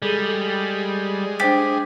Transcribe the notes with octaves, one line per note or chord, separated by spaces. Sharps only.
G3 G#3 G#4 A4 D#7
D4 G4 C5 A6